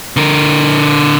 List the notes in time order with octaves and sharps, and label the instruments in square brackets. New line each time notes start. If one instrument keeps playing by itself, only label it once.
[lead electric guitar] D3 A#4